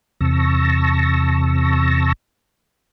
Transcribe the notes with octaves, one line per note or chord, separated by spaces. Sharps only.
E2 C3 A5 C#6 E6 A#6